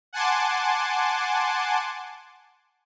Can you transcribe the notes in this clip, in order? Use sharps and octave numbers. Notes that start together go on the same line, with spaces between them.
F#5 G#5 A5 C6 D6